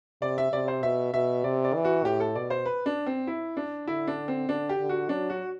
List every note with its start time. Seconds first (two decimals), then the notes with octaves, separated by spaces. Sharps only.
0.22 C3 D5
0.38 E5
0.52 C3 D5
0.68 C5
0.83 B2 E5
1.13 B2 E5
1.44 C3 D5
1.64 D5
1.75 E3
1.85 F#4
2.05 A2 G4
2.20 A4
2.35 B2 D5
2.50 C5
2.66 B4
2.86 D4
3.06 C4
3.27 E4
3.57 D4
3.87 D3 E4
4.07 D4
4.28 C4
4.49 D3 D4
4.69 G4
4.80 D3
4.89 F#4
5.09 F#3 D4
5.30 F#4